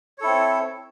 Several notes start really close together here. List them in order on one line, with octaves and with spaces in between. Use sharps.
C#5 A4 E4 C4